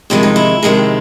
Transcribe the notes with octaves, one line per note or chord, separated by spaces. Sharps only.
F2 C3 D#3 G#3 E4
D#4
E4
F2 C3 D#3 G#3